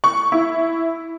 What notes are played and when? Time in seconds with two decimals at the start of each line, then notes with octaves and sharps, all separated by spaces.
0.04 C#6
0.32 E4